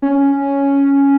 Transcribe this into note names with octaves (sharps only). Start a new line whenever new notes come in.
C#4